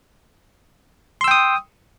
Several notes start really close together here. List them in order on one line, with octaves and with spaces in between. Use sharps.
C6 E6 G5 D#6